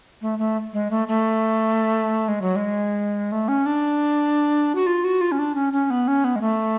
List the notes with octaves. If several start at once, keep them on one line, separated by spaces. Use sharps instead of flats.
A3
A3
G#3
A3
A3
G#3
F#3
G#3
A3
C#4
D4
F#4
F4
F#4
F4
C#4
D4
C#4
C#4
B3
C#4
B3
G#3
A3